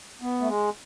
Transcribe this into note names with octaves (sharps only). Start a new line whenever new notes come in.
B3
A3
G#3